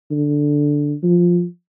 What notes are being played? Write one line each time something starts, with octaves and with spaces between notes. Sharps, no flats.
D3
F3